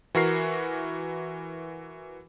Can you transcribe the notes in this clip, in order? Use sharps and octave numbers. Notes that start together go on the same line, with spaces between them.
E3 F#4 A#4 C7